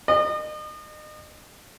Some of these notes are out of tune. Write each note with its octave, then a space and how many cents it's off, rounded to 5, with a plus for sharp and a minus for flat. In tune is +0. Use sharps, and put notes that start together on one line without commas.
D#5 -35